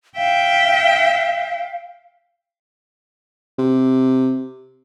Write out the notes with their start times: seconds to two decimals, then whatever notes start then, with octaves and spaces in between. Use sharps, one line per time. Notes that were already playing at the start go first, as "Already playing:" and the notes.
0.16 E5 F5 G5
3.58 C3